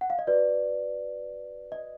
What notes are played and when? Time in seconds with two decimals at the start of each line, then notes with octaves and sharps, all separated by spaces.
0.01 F#5
0.10 F5
0.19 D#5
0.27 F#4 B4 D5
1.72 D#5